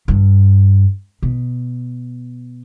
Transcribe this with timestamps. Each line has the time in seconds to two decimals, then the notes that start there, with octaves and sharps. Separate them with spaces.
0.08 G2
1.23 B2